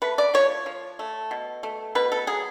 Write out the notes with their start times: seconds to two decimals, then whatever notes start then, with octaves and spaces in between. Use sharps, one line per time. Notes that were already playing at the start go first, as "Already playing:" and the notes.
0.02 A3 B4
0.18 D5
0.34 F3 C#5
0.66 F3
0.99 A3
1.31 B2
1.63 A3
1.95 B2 B4
2.12 A4
2.27 F#3 G#4